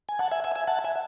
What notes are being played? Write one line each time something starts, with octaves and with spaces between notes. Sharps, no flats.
G#5
F#5 A5
E5 G#5
E5 G#5
E5 G#5
F#5 A5
E5 G#5